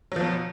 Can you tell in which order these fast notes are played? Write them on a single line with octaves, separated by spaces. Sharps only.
F#3 F3 B2